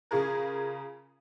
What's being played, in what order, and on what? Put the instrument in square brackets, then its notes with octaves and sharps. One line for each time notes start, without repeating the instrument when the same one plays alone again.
[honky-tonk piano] C#3 F4 G#4 A#4